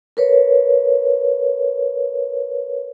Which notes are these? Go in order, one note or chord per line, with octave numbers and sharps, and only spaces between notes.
A#4 B4 C#5